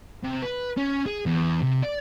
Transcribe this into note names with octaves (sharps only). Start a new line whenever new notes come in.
C3
B4
C#4
G#4
E2
C3
D5